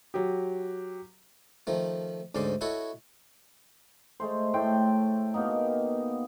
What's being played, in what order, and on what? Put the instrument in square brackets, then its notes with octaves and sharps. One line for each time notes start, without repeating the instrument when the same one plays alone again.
[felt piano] F#3 G4
[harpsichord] D#3 F3 A3
D2 G#2 C#4 D5 C6
E4 F#4 A4 C#5 D#5
[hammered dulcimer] G#3 A3 C5
A2 A3 G5 C6
B2 A#3 B3 D#4